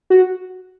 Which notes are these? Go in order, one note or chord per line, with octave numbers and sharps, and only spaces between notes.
F#4